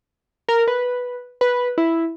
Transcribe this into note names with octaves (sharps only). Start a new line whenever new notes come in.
A#4
B4
B4
E4